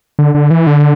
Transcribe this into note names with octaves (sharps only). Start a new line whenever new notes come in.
D3
D3
E3
D3